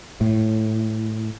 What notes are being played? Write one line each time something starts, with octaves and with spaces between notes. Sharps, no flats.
A2